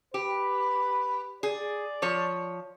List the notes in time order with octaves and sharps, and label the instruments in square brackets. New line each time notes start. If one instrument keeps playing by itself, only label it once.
[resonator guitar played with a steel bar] G4 [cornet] B4
[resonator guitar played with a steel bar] G#4 [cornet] D5
[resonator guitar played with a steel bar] F3 C#5